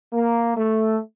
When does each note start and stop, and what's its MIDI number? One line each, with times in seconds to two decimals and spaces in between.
0.14 0.56 58
0.57 0.98 57